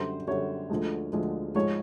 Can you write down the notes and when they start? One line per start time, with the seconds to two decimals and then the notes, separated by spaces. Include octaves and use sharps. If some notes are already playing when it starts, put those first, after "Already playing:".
Already playing: F#2 D3 G3 C5
0.27 F#2 D3 G3 C#5
0.69 D2 D3 F3 G#3
1.13 D2 D3 F3 G#3
1.55 G#2 F3 G#3 C#5